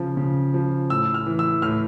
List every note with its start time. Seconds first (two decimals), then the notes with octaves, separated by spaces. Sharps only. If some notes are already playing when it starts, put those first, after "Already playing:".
Already playing: C#3 F3
0.17 C#3
0.54 F3
0.90 A2 E6
1.14 F6
1.27 E3
1.39 E6
1.62 A2 F6